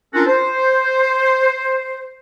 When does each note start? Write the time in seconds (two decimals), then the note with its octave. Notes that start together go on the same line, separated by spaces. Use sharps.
0.13 C#4 D4 F4 F#4 A4 A#4
0.26 C5